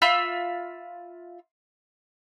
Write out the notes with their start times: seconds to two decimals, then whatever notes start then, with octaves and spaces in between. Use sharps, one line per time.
0.02 F4 E5 B5 G6